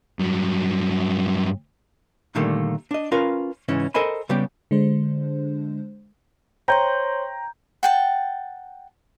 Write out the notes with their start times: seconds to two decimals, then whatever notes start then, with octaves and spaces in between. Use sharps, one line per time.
0.19 G2 F#3
2.35 A#2 D3 D#3 G3 A3 A#3
2.91 D4 D#5
3.12 C#4 F4 A#4 B4 F5
3.68 G#2 C#3 E3 C#4
3.94 A4 A#4 C5 D#5 G#5 B5
4.29 C#3 G3 B3 G4
4.71 D3 G#3 D4 C5
6.68 C5 C#5 G5 A#5 C6 G6
7.83 F#5 G5 A5